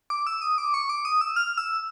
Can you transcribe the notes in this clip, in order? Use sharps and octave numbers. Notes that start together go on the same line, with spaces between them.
D6
E6
D#6
D6
C#6
D6
D#6
E6
F6
E6